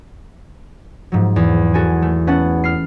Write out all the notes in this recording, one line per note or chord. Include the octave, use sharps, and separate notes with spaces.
G#2 F3 F#3
E2
F#4 A4 G#5
A3
B3 C#4 F#5 A5
F6 C7